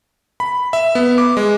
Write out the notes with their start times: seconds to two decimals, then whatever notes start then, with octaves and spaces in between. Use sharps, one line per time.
0.40 B5
0.73 E5
0.95 B3
1.18 D6
1.37 G#3